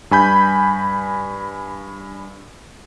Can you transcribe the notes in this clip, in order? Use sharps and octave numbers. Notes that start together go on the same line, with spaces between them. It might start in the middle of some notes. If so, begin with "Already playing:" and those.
G2 G#5 B5 G6